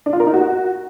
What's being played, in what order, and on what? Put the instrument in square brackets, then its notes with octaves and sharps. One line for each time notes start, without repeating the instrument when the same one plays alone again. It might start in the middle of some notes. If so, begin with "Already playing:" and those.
[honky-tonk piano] D4
F4
A#4
D#4
F#4